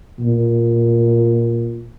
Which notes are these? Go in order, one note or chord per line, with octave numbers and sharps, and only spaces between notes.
A#2